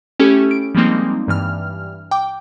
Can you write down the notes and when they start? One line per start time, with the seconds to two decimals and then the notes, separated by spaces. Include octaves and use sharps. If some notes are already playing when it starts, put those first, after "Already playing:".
0.19 A3 C#4 E4 G4 A4
0.51 D7
0.75 F3 G3 G#3 A#3 C4 D#4
1.28 G2 E3 F6
2.11 G5 D6